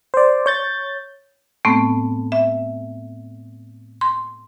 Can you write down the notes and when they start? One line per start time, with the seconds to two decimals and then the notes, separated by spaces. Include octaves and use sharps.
0.14 C5 D5
0.46 C#5 G6 A6
1.65 A2 A3 B3 C4
2.32 E5
4.01 C6